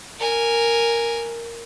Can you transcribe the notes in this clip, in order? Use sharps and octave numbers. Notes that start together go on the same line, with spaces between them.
A#4 G#5